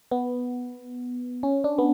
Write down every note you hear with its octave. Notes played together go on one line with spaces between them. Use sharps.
B3
C#4
D4
B3